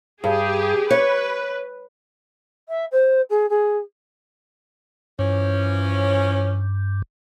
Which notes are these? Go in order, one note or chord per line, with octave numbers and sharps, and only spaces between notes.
G2 G4 G#4
B4 C#5
E5
C5
G#4
G#4
G2 E3 F3 C#4